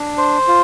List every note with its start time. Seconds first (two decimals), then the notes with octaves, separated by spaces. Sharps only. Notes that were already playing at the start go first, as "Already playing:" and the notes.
Already playing: D4
0.18 C5
0.48 F4